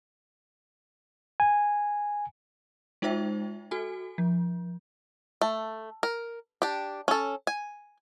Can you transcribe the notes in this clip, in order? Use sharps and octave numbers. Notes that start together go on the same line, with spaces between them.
G#5
G#3 D#4 F4 C5 E5 G5
F#4 A4 G#5
F3
A3
A#4
D4 G4
C#4 A4
G#5